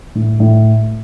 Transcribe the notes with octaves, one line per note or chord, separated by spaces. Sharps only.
A2
A2